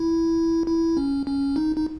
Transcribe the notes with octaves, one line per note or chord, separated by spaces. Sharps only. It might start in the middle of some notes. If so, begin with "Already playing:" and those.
Already playing: E4
E4
C#4
C#4
D#4
D#4